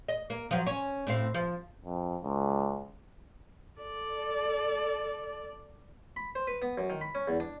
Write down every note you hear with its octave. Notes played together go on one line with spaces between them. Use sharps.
D#5
A#3
F3 F#3
C#4
A2 C4 F5
F3
F2
C#2
A4 D5
B5
C5
B4
B3
F#2
D#3
B5
C#4
E2
D4